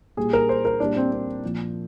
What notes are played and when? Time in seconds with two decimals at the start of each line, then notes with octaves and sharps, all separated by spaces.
0.17 A#2 G3 G#4
0.33 A#4
0.49 C5
0.65 A#4
0.80 A#2 G3 D4
0.96 C4
1.12 C4
1.43 A#2 F3